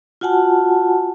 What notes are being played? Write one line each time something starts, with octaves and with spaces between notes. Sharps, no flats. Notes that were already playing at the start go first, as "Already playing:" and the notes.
F4 F#4 F#5 G#5 A5